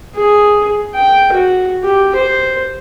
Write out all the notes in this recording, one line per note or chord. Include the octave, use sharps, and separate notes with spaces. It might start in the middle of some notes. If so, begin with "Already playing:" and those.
G#4
G5
F#4
G4
C5